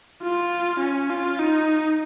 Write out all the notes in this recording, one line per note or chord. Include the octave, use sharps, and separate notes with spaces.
F4
C#4
F4
D#4